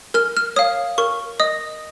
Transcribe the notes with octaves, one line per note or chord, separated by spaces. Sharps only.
A#4 F6
F6
C#5 F5 D#6
A#4 C#6
D#5 D#6